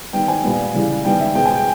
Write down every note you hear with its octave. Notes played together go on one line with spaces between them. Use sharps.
D#3 G3 B3 G5
G#5
A#2 G3 B3
C#3 E3 G3
D#3 G3 B3 G5
E5
B2 G#3 B3 G5
G#5
G5